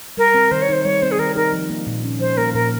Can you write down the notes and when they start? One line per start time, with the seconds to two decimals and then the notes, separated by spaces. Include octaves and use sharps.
0.17 G3 A#4
0.34 C4
0.51 D#3 C5
0.62 C#5
0.69 D#4 C5
0.85 G3 C#5
1.02 C4 C5
1.12 G#4
1.19 D#3 A#4
1.36 D#4 A#4
1.52 F3
1.70 A#3
1.87 A#2
2.04 C#4
2.20 F3 C5
2.37 A#3 A#4
2.54 A#2 A#4